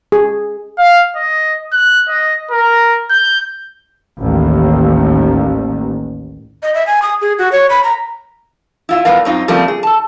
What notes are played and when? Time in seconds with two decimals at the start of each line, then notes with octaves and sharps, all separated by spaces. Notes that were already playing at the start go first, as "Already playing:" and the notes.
0.12 G#4
0.78 F5
1.16 D#5
1.73 F#6
2.09 D#5
2.51 A#4
3.10 G6
4.20 A1 D#2
6.63 D#5
6.74 E5
6.87 G#5
7.02 D#6
7.21 G#4
7.39 F#4
7.52 C#5
7.70 B5
7.84 A#5
8.89 E4 F4 E5
9.05 A2 G3 B3 A#4 F5
9.25 F#2 C4 D#4 F4
9.48 C#3 F3 G3 A3 A#3 C4
9.68 G#4
9.83 A4 A5